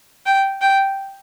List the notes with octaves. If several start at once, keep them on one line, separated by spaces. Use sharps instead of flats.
G5
G5